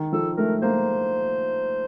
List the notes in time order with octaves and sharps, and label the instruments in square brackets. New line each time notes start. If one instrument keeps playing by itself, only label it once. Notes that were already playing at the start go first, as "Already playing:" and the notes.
Already playing: [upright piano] D#3
[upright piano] F3 [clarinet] A4
[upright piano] A3 [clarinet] A#4
[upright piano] A#3 [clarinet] C5